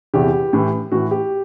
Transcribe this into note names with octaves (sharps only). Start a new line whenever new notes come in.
E2 C3 E3 G4
A2 E3
A2 E3 F#4
G4